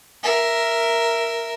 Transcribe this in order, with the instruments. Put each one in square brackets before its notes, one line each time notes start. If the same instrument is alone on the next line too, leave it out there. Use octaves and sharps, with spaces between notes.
[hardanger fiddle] A#4 E5